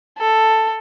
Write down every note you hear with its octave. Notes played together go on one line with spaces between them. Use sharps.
A4